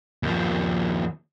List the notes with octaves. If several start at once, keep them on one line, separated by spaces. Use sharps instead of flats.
D#2 F3